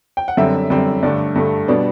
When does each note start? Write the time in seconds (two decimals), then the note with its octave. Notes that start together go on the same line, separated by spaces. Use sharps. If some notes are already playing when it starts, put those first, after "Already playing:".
0.17 G5
0.28 F#5
0.37 F#2 D3 G3 C4 E5
0.70 F#2 D3 G3 C4
1.03 G2 D3 A3 D5
1.36 G2 D3 A3
1.68 B2 G3 B3 D4